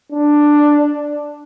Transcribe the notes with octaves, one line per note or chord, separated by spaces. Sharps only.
D4